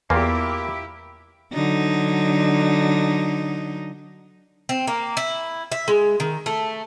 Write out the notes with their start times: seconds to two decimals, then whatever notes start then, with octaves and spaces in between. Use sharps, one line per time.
0.10 E2 A#3 E4 F4 G4
1.53 D3 F#3 D#4
4.69 C4
4.87 A#3
5.17 E4
5.72 E5
5.88 G#3
6.20 D#3
6.46 A3